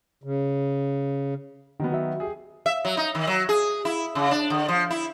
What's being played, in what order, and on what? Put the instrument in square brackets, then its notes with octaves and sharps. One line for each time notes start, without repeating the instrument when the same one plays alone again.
[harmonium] C#3
[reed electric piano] D3 [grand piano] D#3 F#3 B3
[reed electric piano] F#4 E5
[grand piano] G4 G#4
[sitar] E5
F#3
D#4
D#3
F#3
G#4
E4
C#3
D4
D3
F3
E4